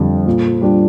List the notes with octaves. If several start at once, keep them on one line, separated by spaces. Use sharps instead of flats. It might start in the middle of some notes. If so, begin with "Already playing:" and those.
Already playing: F2 D3 G3
A#2
G3 D4 F4